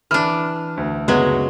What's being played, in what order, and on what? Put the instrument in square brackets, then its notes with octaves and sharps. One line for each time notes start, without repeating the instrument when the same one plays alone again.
[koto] E3 D4 [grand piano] F6
[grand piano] D2
[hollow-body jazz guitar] C#2 F#2 B3 [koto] F#3 G#3